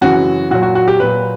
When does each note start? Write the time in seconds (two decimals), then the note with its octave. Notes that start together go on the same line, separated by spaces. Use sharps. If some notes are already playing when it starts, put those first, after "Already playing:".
0.01 F#2 C#3 E3 F#4
0.51 A#2 F#4
0.55 F#3
0.63 F#4
0.75 F#4
0.88 G4
1.00 A#2 F#3 B4